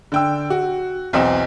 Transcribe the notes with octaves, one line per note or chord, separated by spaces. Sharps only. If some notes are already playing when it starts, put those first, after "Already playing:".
D3 G5 E6
F#4
B1 E2 C4 D#5 E7